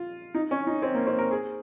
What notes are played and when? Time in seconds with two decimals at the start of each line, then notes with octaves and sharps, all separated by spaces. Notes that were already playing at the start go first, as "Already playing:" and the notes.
Already playing: F4
0.35 D#4
0.51 C#4
0.67 D#4
0.82 C4
0.95 A#3
1.07 C4
1.18 A#4
1.31 G#4